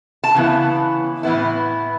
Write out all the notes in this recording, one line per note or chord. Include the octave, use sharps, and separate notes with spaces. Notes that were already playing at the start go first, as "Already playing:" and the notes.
A5
C#3 E3 B3 E4
A2 E3 B3 E4